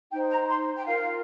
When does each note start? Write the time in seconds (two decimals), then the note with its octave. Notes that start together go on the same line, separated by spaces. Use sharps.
0.10 D#4 C5 G5
0.30 A#5
0.48 C6
0.76 G5
0.85 F4 A#4 F5